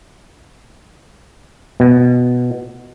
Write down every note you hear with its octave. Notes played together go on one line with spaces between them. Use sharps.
B2